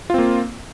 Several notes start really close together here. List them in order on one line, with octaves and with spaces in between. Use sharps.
F4 C4 A#3